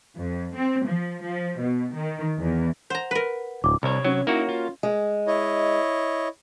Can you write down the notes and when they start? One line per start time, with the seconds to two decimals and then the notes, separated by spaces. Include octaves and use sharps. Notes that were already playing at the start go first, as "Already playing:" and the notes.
0.18 F2
0.55 C4
0.87 F3
1.24 F3
1.61 B2
1.95 D#3
2.39 E2
2.90 C5 F#5 A#5
3.11 A#4 B4
3.64 D1 D6
3.83 C2 C3 C#5
4.05 F#3 C#4
4.27 A#3 D#4 E4 F#4
4.49 F4
4.83 G#3
5.27 E4 C#5 D#5